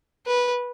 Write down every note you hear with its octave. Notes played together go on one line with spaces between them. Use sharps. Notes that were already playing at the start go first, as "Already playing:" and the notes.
B4